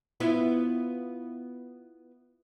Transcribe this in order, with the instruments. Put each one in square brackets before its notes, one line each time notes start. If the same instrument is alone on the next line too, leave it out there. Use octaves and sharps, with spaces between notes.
[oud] B3 E4 F4